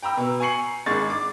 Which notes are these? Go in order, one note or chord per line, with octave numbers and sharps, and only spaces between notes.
G5 A#5 B5 E6
B2
G#5 A#5 C#6 C7 C#7 F#7
G#1 G#3 D4 C#6 A6
D6